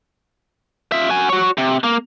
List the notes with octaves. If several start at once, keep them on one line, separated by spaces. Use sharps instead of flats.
F4 E5
F#4 G#5
F#4 C#5
C3
A#3